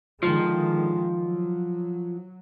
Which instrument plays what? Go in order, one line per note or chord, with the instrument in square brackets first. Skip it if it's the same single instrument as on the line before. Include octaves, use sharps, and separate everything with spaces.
[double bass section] D3 D#3 G#3 [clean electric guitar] F3
[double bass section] F#3